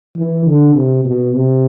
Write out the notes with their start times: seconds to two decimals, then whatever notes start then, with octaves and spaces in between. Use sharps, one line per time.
0.16 E3
0.46 D3
0.75 C3
1.05 B2
1.35 C3